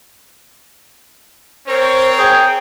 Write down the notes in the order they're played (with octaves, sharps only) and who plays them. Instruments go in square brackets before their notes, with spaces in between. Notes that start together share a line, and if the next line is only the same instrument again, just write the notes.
[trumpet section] C4 A#4 C#5 [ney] C5
[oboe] G#4 [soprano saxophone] G5